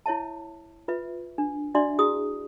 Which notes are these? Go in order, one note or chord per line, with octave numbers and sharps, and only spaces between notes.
E4 C#5 E5 A5
F4 B4 E5
D4
D4 F#4 D5 E5 C6
E4 F#4 G#4 D#6